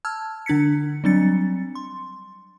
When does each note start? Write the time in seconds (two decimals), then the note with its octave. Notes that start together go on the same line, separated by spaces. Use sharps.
0.05 A5 E6 F6 G#6
0.46 D3 D4 G#6 B6 C#7
1.04 F#3 G3 C4 D4 A6 C#7
1.75 C6